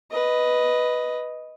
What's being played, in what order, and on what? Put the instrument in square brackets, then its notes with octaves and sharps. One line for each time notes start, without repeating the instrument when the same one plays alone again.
[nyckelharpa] B4 D#5